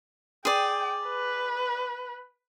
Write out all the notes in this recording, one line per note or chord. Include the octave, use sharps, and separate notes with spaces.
G#4 D5 G5
B4